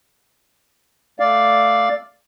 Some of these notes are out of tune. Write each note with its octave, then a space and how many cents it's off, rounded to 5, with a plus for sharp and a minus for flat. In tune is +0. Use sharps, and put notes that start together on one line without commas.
A3 +0 D5 +0 F5 +0